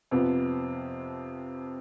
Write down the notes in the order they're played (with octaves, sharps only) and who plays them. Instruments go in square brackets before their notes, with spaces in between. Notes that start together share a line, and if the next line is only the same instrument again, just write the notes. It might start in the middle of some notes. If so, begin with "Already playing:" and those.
[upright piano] F2 C3 F3 B3